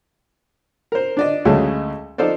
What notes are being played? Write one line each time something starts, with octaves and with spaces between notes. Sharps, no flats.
A#4 C5
D4 D5 D#5
D2 C#3 F#3 G#3 A3 D#5
F3 D#4 F4 A4 C5 D5